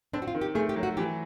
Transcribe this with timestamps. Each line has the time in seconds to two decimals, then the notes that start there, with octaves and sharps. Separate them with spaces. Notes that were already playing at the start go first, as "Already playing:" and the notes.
0.13 C4 D4
0.22 F#4
0.28 F4
0.35 D#3
0.41 G4
0.55 A3 G#4
0.69 G4
0.76 F#3
0.83 F#4
0.97 E3 G4